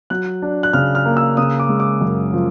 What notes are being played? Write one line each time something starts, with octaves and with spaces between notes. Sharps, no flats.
F#3 F#6
D4
F#6
C#3 F6
F6
A#3
E6
C#3 D#6
D6
G#3
D6
F#2
F3